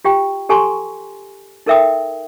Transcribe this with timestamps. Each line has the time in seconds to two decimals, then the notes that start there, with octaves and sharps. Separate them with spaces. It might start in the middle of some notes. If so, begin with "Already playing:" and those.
0.05 F4 G4 G5
0.49 G4 A4 G#5 A#5 C6 C#6
1.66 D#4 A4 A#4 E5 G5 D#6